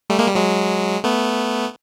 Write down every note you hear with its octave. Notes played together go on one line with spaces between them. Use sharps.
G3 A3
G#3 A#3
G3
F#3 G#3
A3 B3